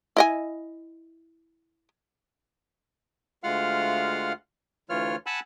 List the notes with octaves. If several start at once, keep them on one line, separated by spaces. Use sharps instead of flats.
E4 D#5 G#5
D2 G#3 F4 F5 F#5 F6
D2 E3 F4 C#5 F6
F#5 G#5 A5 B5 E6 F#6